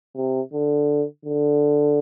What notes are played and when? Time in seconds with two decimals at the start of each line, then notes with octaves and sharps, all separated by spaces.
0.16 C3
0.53 D3
1.25 D3